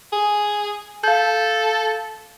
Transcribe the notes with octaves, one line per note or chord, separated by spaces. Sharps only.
G#4
A4 F5 G6